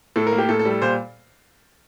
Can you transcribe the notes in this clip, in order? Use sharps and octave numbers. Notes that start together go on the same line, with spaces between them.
A2 A4
A#4
A#3
G4
A2 A4
A4
G3
A4
A#2 C5